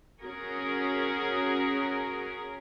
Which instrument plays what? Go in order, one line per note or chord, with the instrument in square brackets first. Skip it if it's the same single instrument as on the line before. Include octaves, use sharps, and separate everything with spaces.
[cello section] C#4 F#4 G#4 A#4